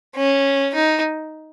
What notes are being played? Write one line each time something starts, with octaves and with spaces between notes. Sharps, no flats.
C#4
D#4